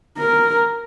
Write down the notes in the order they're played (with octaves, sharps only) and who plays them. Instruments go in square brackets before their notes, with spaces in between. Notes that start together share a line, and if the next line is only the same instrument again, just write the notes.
[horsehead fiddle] A#4